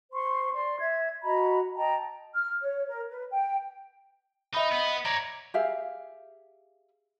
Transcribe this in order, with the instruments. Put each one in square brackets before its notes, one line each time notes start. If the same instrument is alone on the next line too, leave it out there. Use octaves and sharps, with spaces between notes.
[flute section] C5 C6 C#6
D5 C6
E5 G#6
F#4 D#5 A#5 B5
D#5 G5 A5 A#5
F6
C#5
A#4
B4
G5
[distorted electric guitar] D#4 [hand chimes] D#5 E5 B5
[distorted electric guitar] B3
[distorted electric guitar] C#5 D5 [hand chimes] A#5 A#6
[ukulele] G4 G#4 E5 F5